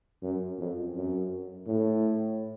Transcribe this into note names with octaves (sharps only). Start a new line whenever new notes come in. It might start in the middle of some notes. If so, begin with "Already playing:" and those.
F#2
F2
F#2
A2